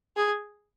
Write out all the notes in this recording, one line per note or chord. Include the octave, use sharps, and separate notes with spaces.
G#4